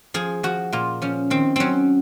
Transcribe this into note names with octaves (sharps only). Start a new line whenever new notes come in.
F3 G#4
F3 F#4
A#2 F4
F3 C#4
D#3 C4
F#3 C4 C#4